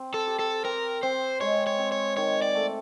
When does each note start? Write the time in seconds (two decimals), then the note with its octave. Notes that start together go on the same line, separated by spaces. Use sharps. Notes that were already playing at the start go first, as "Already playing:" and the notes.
Already playing: C4
0.14 A4
0.27 G4
0.39 A4
0.65 C4 A#4
1.03 C4 C5
1.41 G#3 C#5
1.67 C#5
1.79 C4
1.92 C#5
2.17 D#3 C#5
2.42 D5
2.55 A3